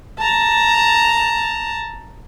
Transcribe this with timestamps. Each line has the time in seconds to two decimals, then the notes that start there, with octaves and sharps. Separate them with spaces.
0.19 A5 A#5